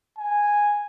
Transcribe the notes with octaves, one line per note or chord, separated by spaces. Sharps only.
G#5